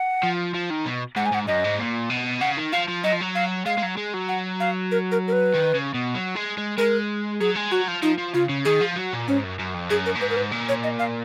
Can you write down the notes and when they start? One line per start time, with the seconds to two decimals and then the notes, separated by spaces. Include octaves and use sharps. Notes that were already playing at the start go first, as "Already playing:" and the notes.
Already playing: F#5
0.23 F3
0.55 F3
0.70 D#3
0.86 B2
1.16 G#2 F#5
1.26 G#5
1.32 G#2 F#5
1.47 F#2 D#5
1.64 G#2
1.79 A#2
2.10 B2
2.41 C#3 F#5
2.57 D#3
2.72 F3 F5
2.89 F3
3.04 F#3 D#5
3.13 F3
3.21 F#3
3.35 F5
3.66 G#3 F5
3.77 G#3
3.82 F#3
3.97 G#3
4.13 F#3
4.29 F#5
4.60 F5
4.91 A#4
5.12 A#4
5.28 A#4
5.32 B4
5.54 D#3
5.75 C#3
5.95 B2
6.15 F#3
6.36 G#3
6.58 G#3
6.78 G#3 A#4
7.41 F#3 G#4
7.56 G#3
7.71 F#3 F#4
7.88 F3
8.03 F3 D#4
8.18 F3
8.34 C#3 F4
8.49 C#3
8.65 D#3 G#4
8.81 F3
8.96 F#3
9.13 A#2
9.28 G#2 C#4
9.44 F#2
9.59 F#2
9.74 F2
9.90 F#2 G#4
10.06 A#4
10.16 A#2
10.21 G#2 B4
10.30 A#4
10.36 B4
10.52 A#2
10.69 C#5
10.84 D#5
10.99 F5